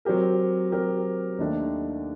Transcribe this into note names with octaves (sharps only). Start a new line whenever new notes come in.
F#3 C4 G4 A#4
F#3 C4 G4 A#4
D#2 D#3 A3 D4